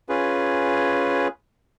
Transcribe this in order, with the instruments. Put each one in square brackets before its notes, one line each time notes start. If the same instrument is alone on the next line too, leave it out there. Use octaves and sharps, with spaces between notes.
[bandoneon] C#4 F4 G#4 B4